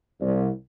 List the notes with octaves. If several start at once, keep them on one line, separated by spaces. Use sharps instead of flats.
C2